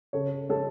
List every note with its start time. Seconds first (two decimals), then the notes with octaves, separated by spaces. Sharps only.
0.13 C#3 A4 C#5
0.49 G#3 A4 C#5